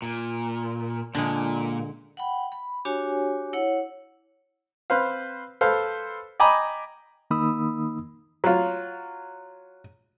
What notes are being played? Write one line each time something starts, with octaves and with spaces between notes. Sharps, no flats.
A#2
A#2 D3 G#3
F#5 G5 B5
B5
D4 F#4 G4 C#5 G#5
E4 C#5 F#5
C4 B4 C5 F5
A4 B4 C5 F5
D#5 G5 G#5 A#5 B5 D6
D#3 A#3 D#4 B5 D#6 E6
F#3 F4